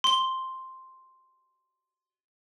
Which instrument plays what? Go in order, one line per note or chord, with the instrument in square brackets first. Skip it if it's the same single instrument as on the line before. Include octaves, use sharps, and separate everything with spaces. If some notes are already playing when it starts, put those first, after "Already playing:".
[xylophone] C6 G7